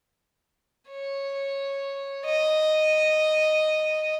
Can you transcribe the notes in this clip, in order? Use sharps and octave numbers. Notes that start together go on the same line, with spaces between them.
C#5
D#5